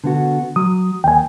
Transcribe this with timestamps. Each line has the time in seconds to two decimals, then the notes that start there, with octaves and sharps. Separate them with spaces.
0.04 D3 B3 F#4
0.56 F#3 D#6
1.04 D#2 G5 G#5